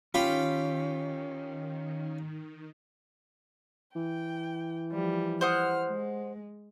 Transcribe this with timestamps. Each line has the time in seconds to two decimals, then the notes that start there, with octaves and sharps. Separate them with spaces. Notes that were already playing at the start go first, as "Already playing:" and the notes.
0.14 D#3 C#4 F4 G4 B5
3.95 E3 G5
4.92 F3 G3
5.41 C5 F#5 D#6 F6
5.89 G#3